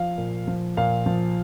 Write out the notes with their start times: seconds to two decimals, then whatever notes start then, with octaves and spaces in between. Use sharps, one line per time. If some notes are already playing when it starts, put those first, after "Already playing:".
Already playing: F3 F5
0.18 A#2
0.48 F3
0.77 A#2 F5
1.06 F3